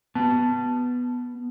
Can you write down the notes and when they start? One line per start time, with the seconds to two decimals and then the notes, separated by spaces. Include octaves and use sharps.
0.15 B3 A5